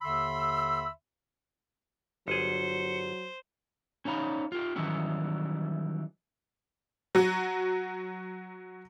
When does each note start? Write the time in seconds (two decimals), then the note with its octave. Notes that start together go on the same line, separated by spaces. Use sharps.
0.02 D#2 D3 E5 B5 C6 E6
2.28 G1 F#3 G#4 C5 C#7
4.05 C#4 D#4 C#5 F5 B5
4.52 F4 G4
4.76 D#3 E3 F#3 G3 C#4 E4
7.15 F#3 F#4